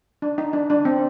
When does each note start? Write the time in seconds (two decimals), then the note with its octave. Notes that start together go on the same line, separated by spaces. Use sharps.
0.22 D4
0.38 D#4
0.53 D4
0.70 D4
0.85 C4